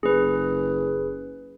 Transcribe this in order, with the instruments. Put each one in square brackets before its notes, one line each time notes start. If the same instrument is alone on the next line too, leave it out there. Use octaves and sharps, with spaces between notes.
[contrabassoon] F#1 [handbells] G#4 B4